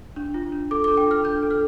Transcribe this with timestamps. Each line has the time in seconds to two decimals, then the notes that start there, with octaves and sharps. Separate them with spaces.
0.16 D4
0.34 F4
0.52 D4
0.71 A4 D6
0.84 D4 D6
0.97 G5
1.07 F4 F6
1.24 D4 G6
1.43 A4
1.51 F6